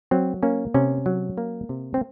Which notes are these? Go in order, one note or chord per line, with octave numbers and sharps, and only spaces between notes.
F#3 C4
A#3 C#4
C3 C#4
F#3
A#3
C3
C4